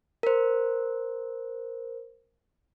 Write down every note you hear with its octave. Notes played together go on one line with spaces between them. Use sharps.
A#4 C5